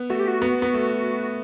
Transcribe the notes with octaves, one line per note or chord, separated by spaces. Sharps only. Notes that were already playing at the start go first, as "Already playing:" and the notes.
Already playing: B3
A3 F#4
G4
F#4
B3
B3
A3